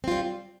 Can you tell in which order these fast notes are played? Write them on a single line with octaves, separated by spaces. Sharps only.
C4 F4 G3